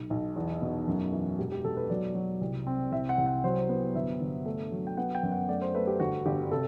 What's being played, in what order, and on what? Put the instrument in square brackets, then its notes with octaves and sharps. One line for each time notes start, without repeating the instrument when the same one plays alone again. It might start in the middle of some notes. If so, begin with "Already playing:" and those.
Already playing: [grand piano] B1
B1
E2
B2
F#2
E3 F#4
E1 G4
G4
B2 A4
B4
F#3 D5
F#3
C2
C4
C2 E5
F#5
C2
F#5
F#3 C5
B3
G1 E5
G1
A3
F#3
G5
B3 F#5
G5
F#2
F#5
A3 D5
C5
A3 B4
G4
G1 F#4
G1 G4
C3 A4